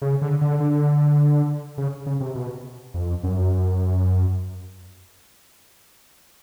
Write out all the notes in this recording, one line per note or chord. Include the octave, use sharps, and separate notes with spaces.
C#3
D3
D3
D3
C#3
C#3
C3
B2
F2
F#2